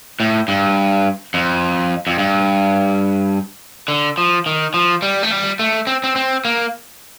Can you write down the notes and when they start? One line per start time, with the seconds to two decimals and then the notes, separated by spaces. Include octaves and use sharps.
0.20 A2
0.48 G2
1.34 F2
2.07 F2
2.19 G2
3.88 D3
4.18 F3
4.46 D#3
4.74 F3
5.02 G3
5.23 A3
5.31 G3
5.59 A3
5.87 C4
6.04 C4
6.16 C4
6.45 A#3